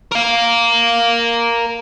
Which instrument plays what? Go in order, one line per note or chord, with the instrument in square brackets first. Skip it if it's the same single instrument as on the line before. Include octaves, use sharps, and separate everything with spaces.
[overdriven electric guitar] A#4 F5